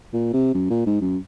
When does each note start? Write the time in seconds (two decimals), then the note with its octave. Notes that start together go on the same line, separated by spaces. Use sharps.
0.14 A#2
0.34 C3
0.54 F#2
0.71 A#2
0.87 G#2
1.01 F#2